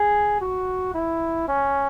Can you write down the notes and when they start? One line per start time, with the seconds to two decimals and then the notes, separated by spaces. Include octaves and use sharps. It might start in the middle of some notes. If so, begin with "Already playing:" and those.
Already playing: G#4
0.41 F#4
0.94 E4
1.48 C#4